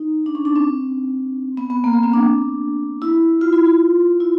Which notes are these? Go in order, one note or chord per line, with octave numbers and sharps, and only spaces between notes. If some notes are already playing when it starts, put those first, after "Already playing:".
Already playing: D#4
D4
C#4
D4
C4
B3
B3
A#3
B3
C4
D4
E4
F4
E4
F4
E4